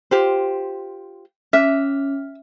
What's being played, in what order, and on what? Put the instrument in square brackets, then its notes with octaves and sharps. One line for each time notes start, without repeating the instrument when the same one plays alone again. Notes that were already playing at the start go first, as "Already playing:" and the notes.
[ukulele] F4 G4 C5
[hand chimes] C#4 F6 [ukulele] E5